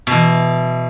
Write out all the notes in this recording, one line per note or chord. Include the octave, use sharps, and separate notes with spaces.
B2 E3